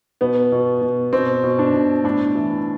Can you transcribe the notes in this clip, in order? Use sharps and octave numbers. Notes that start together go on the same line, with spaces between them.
B2 B3
B2
B2
B2 C4
B2
D4
B2
A2 D4
E3